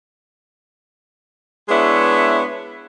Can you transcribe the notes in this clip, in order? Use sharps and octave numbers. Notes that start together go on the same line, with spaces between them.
G#3 B3 D4 E4 C#5 E5